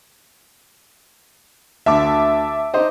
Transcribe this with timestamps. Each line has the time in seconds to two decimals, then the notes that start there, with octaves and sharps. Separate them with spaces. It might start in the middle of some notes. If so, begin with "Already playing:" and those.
1.86 D2 E5 A5 D6
2.74 D#4 C5 D#5